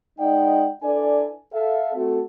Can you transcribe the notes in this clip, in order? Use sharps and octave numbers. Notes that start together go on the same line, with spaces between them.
G#3 D#4 D5 D#5 F#5 G5
D4 E4 A4 B4 D5 G#5
A4 E5 F5
A3 C4 F#4 A4